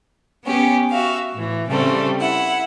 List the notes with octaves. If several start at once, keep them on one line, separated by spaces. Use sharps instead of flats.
B3 C#4 G4
F#4 E5 F5
A2 E3
C#3 G3 A3 C4
E4 F#5